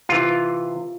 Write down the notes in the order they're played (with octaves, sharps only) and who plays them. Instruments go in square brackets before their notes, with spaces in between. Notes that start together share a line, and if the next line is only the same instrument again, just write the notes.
[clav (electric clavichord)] C3 E3 F4